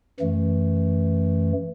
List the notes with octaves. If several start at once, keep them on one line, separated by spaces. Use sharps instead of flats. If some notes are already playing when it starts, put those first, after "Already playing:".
F#2 E3 A3